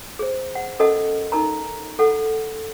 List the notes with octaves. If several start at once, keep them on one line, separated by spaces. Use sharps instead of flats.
G#4 C5
F#5
C#4 A4 A#4 D#5 F#5 A5
D#4 A#4 A5 A#5
A4 F#5